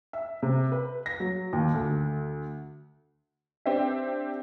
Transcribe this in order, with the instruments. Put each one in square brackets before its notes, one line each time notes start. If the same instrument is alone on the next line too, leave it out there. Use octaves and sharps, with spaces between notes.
[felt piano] E5
C3
B4
A#6
F#3
D#2
D2
[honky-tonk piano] C4 D4 G4 D5 E5